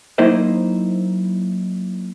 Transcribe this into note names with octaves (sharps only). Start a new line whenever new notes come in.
F#3 A#3 D#4 E4 C5 D#5